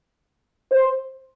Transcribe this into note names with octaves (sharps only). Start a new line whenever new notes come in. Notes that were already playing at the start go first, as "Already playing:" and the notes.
C5